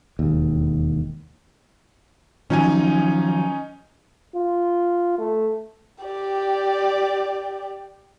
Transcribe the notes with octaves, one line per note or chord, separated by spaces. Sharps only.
E1 D#2
D#3 F3 F#3 C#4 D#4 G#5
F4
A3
G4 D5